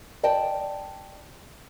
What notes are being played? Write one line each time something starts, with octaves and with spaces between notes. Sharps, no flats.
D5 D#5 G5 A5